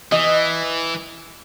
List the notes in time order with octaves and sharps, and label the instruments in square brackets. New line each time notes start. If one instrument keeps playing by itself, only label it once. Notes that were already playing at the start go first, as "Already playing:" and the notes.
[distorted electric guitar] E3 [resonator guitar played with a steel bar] D#5